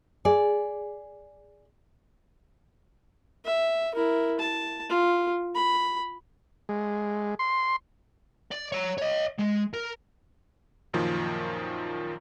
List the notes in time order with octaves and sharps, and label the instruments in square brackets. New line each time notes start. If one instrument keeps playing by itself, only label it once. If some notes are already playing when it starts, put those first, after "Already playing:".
[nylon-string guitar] G#4 D5
[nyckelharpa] E5
E4 A#4
A5
F4
B5
[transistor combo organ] G#3
C6
[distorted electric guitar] D5
C#5 A#5
C#5 D#5
G#3
A#4
[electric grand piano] F#2 A#2 D#3 F3